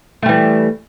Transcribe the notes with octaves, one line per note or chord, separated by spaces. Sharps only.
E3 G3 A3